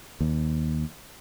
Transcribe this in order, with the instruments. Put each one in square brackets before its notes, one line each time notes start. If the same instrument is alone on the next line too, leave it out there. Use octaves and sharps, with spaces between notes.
[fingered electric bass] D#2